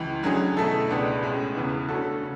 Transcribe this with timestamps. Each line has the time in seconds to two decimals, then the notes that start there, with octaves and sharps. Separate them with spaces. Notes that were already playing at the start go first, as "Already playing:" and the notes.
Already playing: C#2 E3
0.23 D3 F#3 C#4 G#4
0.57 B2 A3 E4 A4
0.89 C#2 B2 G#3 B3 D4
1.23 A2 G#3 C#4
1.55 E2 C#3 E3 B3
1.89 D3 A3 C#4 F#4 A4
2.21 C#3